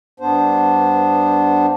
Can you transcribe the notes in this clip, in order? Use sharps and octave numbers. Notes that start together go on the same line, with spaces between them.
G2 B3 D4 C5